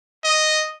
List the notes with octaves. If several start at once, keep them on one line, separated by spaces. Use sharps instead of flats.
D#5